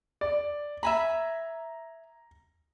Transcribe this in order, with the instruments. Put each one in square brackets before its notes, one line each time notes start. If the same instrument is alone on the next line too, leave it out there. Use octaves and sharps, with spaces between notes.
[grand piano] D5
[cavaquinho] E5 G#5 B5 [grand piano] A#5